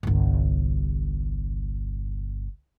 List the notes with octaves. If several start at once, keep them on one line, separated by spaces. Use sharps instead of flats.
G1 C2